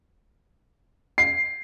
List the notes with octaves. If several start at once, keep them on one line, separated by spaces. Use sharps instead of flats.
C7